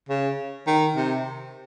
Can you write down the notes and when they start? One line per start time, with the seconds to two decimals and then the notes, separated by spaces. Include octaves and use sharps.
0.09 C#3
0.67 D#3
0.96 C3